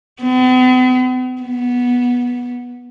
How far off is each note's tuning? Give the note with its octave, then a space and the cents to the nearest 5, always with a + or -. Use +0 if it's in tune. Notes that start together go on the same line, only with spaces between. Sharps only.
B3 +45
B3 -10